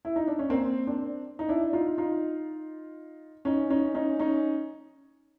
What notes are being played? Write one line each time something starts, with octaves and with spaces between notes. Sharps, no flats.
E4
D#4
D4
C#4
A#3 C4
C4 D4
D#4
D4 E4
D#4 F4
D#4 F4
C#4 D#4
C#4 D#4
C#4 D#4
C#4 D#4